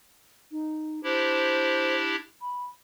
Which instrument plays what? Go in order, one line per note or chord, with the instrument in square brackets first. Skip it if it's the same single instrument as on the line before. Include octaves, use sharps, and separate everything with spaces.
[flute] D#4
[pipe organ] D4 E4 G4 [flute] C5
[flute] B5